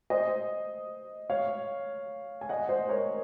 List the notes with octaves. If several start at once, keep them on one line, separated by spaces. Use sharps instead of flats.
C5 D#5
C#5 F5
G#5
D#5 F#5
C5 D#5
A#4 C#5